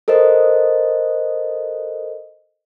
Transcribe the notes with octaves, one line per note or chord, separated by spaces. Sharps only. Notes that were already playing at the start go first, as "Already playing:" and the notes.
A4 A#4 C5 D#5